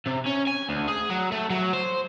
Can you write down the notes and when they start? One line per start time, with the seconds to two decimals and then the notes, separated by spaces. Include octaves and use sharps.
0.07 C3
0.27 C#4
0.47 G#5
0.69 D2
0.88 G#4
1.10 F#3
1.32 A3
1.50 F#3
1.73 C5